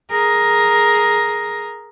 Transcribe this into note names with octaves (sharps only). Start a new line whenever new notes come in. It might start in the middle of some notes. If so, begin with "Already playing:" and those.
G#4 A#4